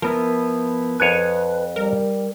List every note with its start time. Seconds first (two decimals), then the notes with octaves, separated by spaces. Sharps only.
0.02 F3 B3 E4 A#4
1.00 F2 B4 C#5 G#5 F#6
1.76 G3 A#4